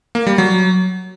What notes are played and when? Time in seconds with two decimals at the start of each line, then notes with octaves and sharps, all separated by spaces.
0.15 A#3
0.27 G3
0.38 F#3